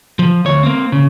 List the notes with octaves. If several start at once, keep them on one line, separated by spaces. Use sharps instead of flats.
F3
D2 C#5
A#3 C4
C#3